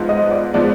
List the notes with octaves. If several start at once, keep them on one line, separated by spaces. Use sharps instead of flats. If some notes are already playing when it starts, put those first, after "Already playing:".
Already playing: G#2 F3 G#3 B3
D#5
D5
F3 G#3 B3 D5